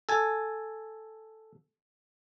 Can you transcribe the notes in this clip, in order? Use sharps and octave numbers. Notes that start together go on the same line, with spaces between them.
A4 G#5